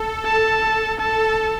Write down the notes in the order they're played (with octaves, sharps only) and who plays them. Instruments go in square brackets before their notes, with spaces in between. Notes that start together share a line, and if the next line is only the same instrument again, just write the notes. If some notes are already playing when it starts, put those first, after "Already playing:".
Already playing: [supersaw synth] A4
[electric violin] A5
[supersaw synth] A4 [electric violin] A5